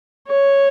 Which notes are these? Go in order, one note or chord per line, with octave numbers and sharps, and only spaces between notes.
C#5